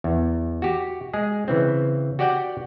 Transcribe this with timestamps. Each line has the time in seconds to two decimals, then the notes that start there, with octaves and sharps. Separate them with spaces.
0.04 E2
0.62 F#4 G4
1.13 G#3 G#4
1.48 C#3 E3 C4
2.19 F#4 G4 D5 F#5 G5